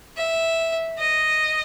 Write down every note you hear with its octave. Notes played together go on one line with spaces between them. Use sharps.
E5
D#5